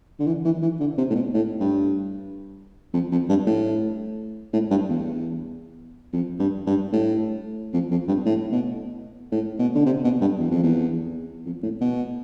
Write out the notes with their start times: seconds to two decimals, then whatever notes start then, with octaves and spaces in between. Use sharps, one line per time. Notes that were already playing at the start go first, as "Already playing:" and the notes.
0.19 D3
0.27 E3
0.45 E3
0.62 E3
0.80 D3
0.98 C3
1.10 A2
1.15 B2
1.34 A2
1.60 G2
2.93 F2
3.11 F2
3.29 G2
3.46 A2
4.53 A2
4.70 G2
4.89 E2
6.13 F2
6.39 G2
6.66 G2
6.92 A2
7.73 F2
7.90 F2
8.08 G2
8.26 A2
8.52 B2
9.32 A2
9.59 B2
9.75 D3
9.86 C3
10.04 B2
10.21 G2
10.39 E2
10.51 F2
10.63 E2
11.45 F2
11.63 A2
11.81 B2